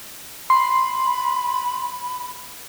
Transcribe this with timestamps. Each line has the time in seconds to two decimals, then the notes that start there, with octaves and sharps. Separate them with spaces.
0.50 B5 C6